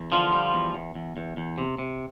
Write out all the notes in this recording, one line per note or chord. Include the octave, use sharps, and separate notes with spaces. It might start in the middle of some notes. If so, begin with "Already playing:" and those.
Already playing: E2
D3 F3 F4
G3
E2
E2
E2
E2
E2
C3
C3